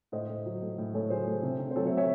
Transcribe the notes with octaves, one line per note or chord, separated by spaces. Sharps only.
A2 C5 D#5
A2
F#3
A3
A2
A2 A4 C#5
F#3 G#4 C5
A3
C3
C3
C5
F#3 A4 C#5
C#5 E5
A3
C#5 E5